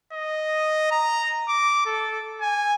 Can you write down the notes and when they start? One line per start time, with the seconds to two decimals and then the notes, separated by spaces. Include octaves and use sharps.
0.13 D#5
0.91 A#5
1.49 D6
1.86 A4
2.41 G#5